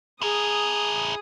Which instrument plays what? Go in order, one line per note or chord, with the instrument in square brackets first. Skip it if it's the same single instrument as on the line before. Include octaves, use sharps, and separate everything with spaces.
[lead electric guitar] E4 A#4 [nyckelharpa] G#4 D#6